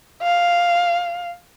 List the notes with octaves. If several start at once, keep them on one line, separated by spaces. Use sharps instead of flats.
F5